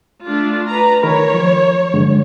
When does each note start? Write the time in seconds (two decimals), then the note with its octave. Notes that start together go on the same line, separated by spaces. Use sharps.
0.24 A3 D4 F4
0.68 B4 A#5
1.03 D#3 A#4 C#5 B5
1.34 F3
1.94 G2 D3 G#3